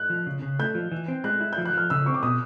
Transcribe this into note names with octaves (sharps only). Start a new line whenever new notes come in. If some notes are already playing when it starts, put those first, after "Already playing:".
Already playing: F#6
F3
C#3
C#3
A3 G6
F3
E3
C4
G#3 F#6
E4
G6
F3
F#6
F3 F6
C#3 E6
C4 C#6
D6
B2 D#6